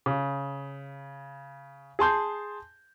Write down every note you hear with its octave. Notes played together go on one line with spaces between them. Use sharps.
C#3
G#4 A5 C6 G6